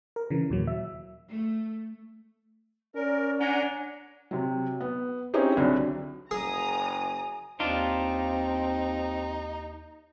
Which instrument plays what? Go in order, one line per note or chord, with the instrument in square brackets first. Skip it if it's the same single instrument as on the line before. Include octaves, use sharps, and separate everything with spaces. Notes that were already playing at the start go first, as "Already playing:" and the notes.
[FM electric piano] A#4
C#3 E3
D#2 A#2 F#3
E5
[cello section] A3
[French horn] C#4 [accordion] A#4 [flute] D5
[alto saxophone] D4 [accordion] F#5 G#5 A#5
[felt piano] C3 F#3
B3
C4 C#4 D#4 E4 G4 G#4
C2 D3 F#3
[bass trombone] F#1 [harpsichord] G#4 [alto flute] G#5 [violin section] A#5 D#6
[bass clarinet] D#2 [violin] C4 [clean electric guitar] D4 F4 [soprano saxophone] D#4